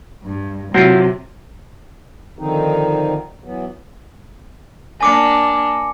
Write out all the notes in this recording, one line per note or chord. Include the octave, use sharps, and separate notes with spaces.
G2
C3 F#3 C4 E4 F4
D3 D#3 F3 C4 D#4
E3 F#3 B3
A#3 D4 G#5 D6 C#7